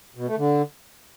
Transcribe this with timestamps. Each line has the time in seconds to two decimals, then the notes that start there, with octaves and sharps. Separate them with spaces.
0.16 B2
0.26 A3
0.37 D3